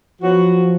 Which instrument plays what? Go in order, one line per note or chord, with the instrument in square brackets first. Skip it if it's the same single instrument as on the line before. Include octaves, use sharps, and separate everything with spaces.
[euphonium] F3 [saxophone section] F#3 B3 F#4